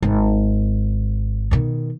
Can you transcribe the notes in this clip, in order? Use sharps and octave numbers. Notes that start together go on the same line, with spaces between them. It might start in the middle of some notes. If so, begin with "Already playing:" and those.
G#1
B2 D#3